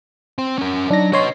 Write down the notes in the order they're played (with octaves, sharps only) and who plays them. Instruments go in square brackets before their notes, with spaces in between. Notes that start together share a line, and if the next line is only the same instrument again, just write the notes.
[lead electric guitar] C4 C5
C#4 A#4
[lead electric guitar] F#3 [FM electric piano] D4 D#4 A#6
[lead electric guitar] B4 D#5 [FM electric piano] C#5 C6